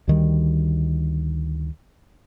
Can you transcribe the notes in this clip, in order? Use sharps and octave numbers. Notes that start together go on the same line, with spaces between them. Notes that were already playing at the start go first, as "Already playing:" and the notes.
D2 D#3 G3